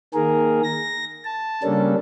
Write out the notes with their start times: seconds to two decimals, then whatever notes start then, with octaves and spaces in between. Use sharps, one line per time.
0.14 D#3 A#3 G#4 A#4
0.63 A#6
1.24 A5
1.63 C#3 G3 A#3 C#4 D4 A4